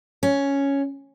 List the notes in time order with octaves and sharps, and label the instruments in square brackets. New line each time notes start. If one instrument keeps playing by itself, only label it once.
[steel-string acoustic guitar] C#4